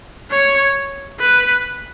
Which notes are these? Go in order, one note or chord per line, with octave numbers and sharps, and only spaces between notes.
C#5
B4